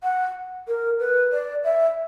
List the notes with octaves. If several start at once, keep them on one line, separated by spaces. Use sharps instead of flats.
F#5
A#4
B4
D5
E5